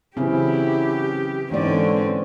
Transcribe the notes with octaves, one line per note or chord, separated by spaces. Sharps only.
C#3 E3 F#3 C4 C#4 E4 G4
G#2 D3 E3 A#3 C4 C#4 D5